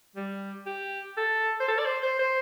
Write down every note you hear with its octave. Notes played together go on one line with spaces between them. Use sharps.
G3
G4
A4
C5
A4
D5
C5
C5
C5